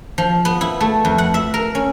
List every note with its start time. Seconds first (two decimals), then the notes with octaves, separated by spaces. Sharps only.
0.18 F3
0.45 B3
0.61 E4
0.81 A3
1.05 F2
1.18 F#5
1.34 E5
1.54 A#4
1.75 C#4